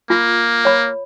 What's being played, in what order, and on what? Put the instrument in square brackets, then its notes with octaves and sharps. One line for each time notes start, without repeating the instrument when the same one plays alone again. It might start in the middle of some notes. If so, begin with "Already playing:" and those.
[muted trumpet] A#3 [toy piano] F4
[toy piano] C#5 B5